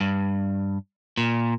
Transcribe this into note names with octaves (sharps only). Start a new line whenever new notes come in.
G2
A#2